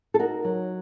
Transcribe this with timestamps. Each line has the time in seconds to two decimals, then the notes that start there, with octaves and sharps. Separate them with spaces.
0.14 A4
0.19 D#4 F#4 A#4
0.45 F#3